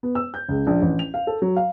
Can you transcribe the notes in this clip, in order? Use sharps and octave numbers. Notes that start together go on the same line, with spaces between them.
B3
E6
G6
C#2
A#1
A1
F7
F5
A4
F#3
F5